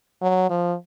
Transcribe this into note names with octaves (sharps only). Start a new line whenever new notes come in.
F#3
F3